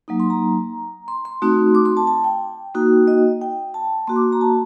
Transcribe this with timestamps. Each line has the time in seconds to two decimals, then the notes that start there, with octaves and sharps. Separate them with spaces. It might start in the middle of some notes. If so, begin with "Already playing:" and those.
0.08 F#3 A#3 D#4
0.20 C6
0.30 A#5
1.08 C6
1.25 C6
1.42 A3 C4 D#4 F#4
1.75 D6
1.86 C6
1.97 A5
2.07 A5
2.24 G5
2.74 A#3 D#4 F#4
3.07 D#5
3.41 G5
3.74 A5
4.07 A#3 F#4 C6
4.16 D6
4.33 A#5
4.41 A5